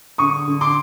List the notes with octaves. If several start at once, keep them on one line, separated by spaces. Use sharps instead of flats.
D3 C#6 D#6
D3
C6 D6